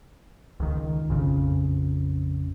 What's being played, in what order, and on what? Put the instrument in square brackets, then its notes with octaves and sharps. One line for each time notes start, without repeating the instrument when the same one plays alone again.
[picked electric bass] C#2 D#3
A#1 F2 C#3